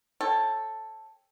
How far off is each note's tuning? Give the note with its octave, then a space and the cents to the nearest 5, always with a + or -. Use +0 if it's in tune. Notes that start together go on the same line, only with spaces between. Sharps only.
A4 +0 C#5 -25 G5 +15